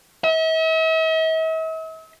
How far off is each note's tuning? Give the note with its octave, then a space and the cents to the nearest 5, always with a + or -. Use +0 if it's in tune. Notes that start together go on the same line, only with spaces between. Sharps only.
E5 -45